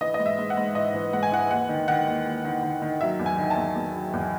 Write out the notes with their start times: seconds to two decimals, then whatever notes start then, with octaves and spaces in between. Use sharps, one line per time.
0.01 E3 D#5
0.14 D#5
0.19 G#2
0.26 E5
0.38 G#2
0.50 F#5
0.57 G#2
0.75 E3 D#5
0.94 E3
1.13 G#2 F#5
1.23 G#5
1.31 E3 F#5
1.51 D#2 F#5
1.69 D#3
1.88 D#3 F#5
2.06 D#2
2.25 D#2
2.45 D#3
2.63 D#3
2.82 D#3
3.01 F#3 E5
3.19 E2
3.26 G#5
3.38 D#3
3.50 A5
3.57 E2
3.75 E2
3.94 F#3
4.13 E2